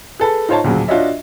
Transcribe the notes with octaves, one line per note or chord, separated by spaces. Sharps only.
G#4 A4 B4
D#4 F4 C5 C#5 A5
D2 A#2 C#3 F3 F#3
D4 F4 F#4 C#5 D#5 E5